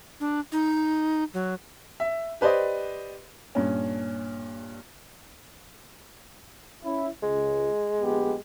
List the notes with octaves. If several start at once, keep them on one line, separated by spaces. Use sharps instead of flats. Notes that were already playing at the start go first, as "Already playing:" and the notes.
D4
D#4
F#3
E5
G4 B4 C5 D5 D#5
G2 A#2 C#4
C#4 E4
C#2 G#3
A#1 B3 G4